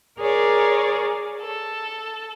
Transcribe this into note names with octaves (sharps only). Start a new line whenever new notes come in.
G#4 A#4 C#5 D5
A4